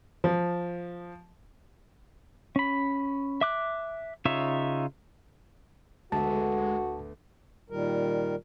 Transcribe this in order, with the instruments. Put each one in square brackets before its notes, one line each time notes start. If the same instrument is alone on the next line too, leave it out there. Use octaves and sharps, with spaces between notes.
[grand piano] F3
[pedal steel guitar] C#4 B5
E5 D6 F#6
C#3 D#4 F4 C#5 E5
[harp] D2 B3 E5 [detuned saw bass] G#3 [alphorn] F#4 [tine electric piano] A5
[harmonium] A#2 D#3 G3 A#4